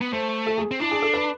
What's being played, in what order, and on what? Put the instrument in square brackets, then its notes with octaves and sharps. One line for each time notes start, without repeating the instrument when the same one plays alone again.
[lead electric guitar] B3
[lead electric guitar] A3 [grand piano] C5
[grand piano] A4
G#4
[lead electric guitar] C4
[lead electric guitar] D4 [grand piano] E4
[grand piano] G#4
A4
B4